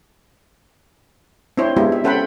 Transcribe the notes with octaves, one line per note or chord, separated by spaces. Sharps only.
C4 D4 E4 C5 C#5
G#3 B3 D4 E4 F4 G4
E5
C#4 A4 C5 F#5 G5 B5